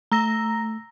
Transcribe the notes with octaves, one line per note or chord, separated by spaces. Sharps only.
A3 A#5 E6 A#6